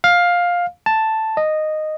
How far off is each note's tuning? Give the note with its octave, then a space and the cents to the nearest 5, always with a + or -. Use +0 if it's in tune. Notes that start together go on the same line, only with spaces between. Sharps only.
F5 +10
A5 +0
D#5 -10